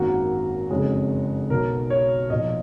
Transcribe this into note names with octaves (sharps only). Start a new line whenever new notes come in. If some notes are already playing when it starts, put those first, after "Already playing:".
Already playing: G#1 F#2 D#3 A#3 F#4
F#1 F2 D#3 G#3 C#4
B1 B2 F#3 A#4
C#5
B1 A#2 F3 D#5